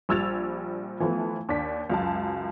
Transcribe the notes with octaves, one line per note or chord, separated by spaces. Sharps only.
A#1 G3 E6 G#6 A6 F7
E3 F3 A3 B3
D#2 D4 B6
C#2 F#2 A5